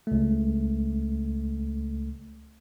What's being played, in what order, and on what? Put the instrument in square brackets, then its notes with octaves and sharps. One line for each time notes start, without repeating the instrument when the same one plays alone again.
[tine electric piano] C#2 A3